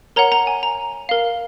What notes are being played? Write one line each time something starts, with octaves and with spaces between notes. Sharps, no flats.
A#4 C#5 F#5 A#5
A#5
G#5
A#5
A#4 F5